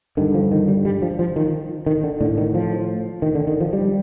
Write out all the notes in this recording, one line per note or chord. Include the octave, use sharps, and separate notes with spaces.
G2 D3 D#3
F3
D#3
G3
G3
F3
F3
D#3
D#3
D3
A2 D3
D#3
F3
D#3
D3
D#3
F3
G3